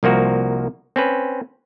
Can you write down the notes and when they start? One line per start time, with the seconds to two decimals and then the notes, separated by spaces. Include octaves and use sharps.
0.03 C2 F3 A#3 F#4
0.96 C4 C#4 B4